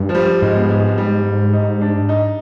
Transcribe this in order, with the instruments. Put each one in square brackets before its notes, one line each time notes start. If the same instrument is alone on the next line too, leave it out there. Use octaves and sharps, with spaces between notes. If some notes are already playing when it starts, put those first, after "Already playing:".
Already playing: [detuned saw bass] G2
[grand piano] F3
G3
[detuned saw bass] G#2 [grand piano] G#3
[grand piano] B3
G#3
G3
D#4
D4
D#4